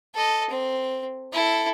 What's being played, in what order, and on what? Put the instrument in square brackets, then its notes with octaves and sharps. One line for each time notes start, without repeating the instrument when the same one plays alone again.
[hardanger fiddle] A4 D#5
C4
E4 A4